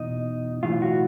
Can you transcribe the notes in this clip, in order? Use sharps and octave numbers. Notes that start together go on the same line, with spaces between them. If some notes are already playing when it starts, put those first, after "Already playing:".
Already playing: E2 B2 D#4
B1 A2 E3 F4
F#4